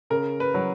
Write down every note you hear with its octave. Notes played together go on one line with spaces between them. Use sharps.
C#3 A#4
B4
F#3